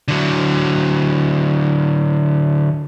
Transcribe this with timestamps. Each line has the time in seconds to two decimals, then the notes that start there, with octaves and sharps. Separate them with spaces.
0.08 D3 F#3